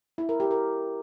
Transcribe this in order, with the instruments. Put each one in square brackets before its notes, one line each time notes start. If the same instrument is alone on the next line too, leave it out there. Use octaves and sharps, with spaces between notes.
[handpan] E4
A#4
G4
A#4